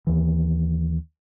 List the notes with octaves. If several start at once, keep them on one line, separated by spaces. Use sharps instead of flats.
D#2 E3